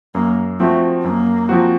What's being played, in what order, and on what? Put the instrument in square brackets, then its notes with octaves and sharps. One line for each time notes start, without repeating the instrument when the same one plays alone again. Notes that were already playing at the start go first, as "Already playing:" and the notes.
[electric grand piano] F#2 [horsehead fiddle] A#3
[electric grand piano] F3 C4 F#4 [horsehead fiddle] A3
[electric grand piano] F#2 [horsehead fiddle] A#3
[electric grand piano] F3 C4 F#4